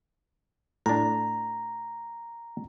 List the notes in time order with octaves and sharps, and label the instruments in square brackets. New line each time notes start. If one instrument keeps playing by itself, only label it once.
[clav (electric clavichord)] A2 D4 [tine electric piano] A#5